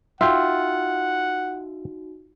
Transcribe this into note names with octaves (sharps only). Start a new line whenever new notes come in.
D#4 F4 F#4 E5 F#5 G5